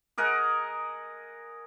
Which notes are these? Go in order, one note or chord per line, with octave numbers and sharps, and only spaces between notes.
G#4 A#4 D#5 F#5